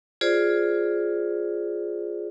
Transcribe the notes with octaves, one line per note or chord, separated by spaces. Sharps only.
F4 G#4 C5 D5